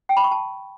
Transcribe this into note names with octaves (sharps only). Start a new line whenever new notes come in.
G5
B5
C#6
A5